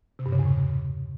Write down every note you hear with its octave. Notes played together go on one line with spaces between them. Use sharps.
C3
G2
C#3
E2
A2